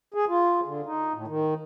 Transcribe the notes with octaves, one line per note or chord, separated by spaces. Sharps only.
G#4
F4
D3
D#4
A2
D#3